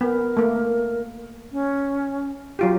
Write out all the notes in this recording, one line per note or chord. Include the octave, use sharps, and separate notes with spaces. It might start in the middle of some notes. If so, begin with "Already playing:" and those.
B3 A#4
A3 A#3
C#4
F#3 F4 G4